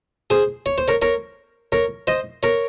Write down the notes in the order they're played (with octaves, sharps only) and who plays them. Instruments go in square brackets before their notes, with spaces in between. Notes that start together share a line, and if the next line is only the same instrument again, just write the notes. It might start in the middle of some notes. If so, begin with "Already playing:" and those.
[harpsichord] G#4 C5
C#5
C5
A#4 C#5
A#4 C#5
A#4 C#5
C5 D#5
A#4 C#5